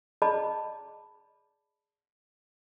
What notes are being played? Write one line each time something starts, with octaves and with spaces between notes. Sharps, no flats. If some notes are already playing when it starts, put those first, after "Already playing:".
G#4 D5 D#5 A5 B5